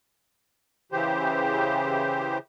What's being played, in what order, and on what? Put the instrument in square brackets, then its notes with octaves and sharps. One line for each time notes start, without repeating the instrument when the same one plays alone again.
[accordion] C#3 E3 G4 C5